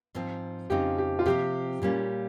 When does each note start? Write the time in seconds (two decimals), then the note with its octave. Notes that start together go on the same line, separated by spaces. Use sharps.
0.15 G#2 F3 C4
0.70 F2 C#3 F3 C4 D#4 G4
0.98 G4
1.19 F4
1.26 C3 F3 C4 G4
1.82 A#2 G3 A#3 C#4